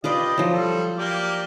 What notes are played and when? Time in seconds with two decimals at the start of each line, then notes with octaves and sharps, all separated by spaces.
0.04 F4 G4 B4 D5 D#5
0.38 F3 F#3
0.52 G3 A4
0.97 A#3 G4 D5